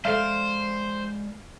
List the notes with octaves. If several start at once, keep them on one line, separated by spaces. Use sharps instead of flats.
G#3 A4 C5 D5 E5 F5